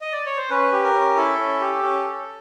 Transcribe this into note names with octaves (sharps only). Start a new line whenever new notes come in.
D#5
D5
C#5
C5
C#4 B4
G4
A#4
C#4
E4 A4
C#4
G4
C#4
A4